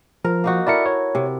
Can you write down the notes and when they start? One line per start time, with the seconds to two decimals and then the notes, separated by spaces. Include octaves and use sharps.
0.25 F3 A#4
0.44 A#3 D#4 F#4
0.67 E4 A4 A#4 D5 E5 C#7
0.86 C#5
1.15 C3